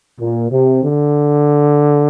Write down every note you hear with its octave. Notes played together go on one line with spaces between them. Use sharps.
A#2
C3
D3